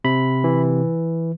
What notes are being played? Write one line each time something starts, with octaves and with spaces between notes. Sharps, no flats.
C3 B5
E3